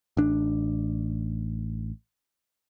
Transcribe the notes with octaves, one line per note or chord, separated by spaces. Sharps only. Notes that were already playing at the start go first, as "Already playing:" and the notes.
A1 D4